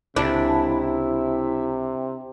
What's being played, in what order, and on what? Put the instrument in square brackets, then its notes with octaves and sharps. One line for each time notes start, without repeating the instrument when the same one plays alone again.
[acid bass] C#2 [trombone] C3 [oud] D4 [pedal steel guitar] E4